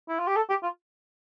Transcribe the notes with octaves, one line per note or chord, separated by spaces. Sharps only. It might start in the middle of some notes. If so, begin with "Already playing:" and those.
E4
F4
G4
A4
G4
F4